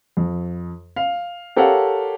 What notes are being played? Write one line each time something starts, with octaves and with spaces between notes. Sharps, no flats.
F2
F5
G4 A4 A#4 C#5 F5 F#5